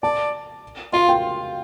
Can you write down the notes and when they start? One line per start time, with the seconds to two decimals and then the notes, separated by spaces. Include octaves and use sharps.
0.03 D5 A5
0.93 F4 F5
1.09 G5